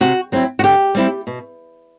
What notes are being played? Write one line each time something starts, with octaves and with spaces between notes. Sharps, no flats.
C3 F#4
F#3 C4 E4
F#4
D3 G4
G3 C4 E4
B2